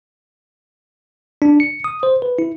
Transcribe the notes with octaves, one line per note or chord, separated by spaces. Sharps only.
D4
C#7
D#6
C5
B4
E4